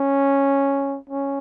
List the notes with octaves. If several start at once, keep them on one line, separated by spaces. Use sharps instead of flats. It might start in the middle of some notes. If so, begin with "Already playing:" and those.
Already playing: C#4
C#4